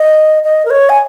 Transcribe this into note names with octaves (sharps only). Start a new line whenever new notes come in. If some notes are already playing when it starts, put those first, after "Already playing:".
Already playing: D#5
D#5
A#4
C#5
G#5